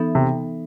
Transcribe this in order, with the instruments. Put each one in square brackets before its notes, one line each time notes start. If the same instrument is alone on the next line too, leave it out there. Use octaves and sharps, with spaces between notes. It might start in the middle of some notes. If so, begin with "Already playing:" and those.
Already playing: [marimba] E3 B3 D#4 A4 E5
[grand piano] C3